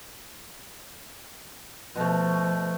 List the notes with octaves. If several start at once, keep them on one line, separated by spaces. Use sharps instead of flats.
B2 F3 A3